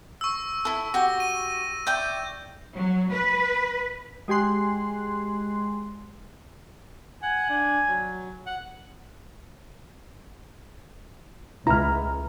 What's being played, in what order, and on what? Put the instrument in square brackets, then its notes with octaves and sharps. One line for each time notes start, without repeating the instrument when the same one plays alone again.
[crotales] C#6 E6
[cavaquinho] E4 A4
[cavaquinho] F#4 G4 [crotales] A#6
[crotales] D#7
[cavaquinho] D5 E5 G5 [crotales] G6
[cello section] F#3
B4
[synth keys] G#3 G4 G#5 C6 F#6
[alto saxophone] F#5 [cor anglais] G#5
[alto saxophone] D4
F#3
F#5
[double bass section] C#2 [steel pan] E4 [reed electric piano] A#5 F6